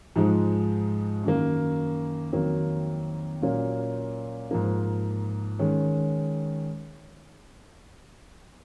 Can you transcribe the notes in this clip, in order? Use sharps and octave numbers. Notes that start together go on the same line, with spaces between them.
G#2 F3 G#3 D#4
F#2 D#3 A#3
F2 D#3 F#3 A#3
A#2 F#3 A#3 C#4
G#2 F3 A#3
D#3 G#3 C#4